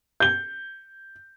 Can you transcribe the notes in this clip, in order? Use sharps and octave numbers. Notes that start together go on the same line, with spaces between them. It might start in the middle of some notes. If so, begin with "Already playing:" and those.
G6 G7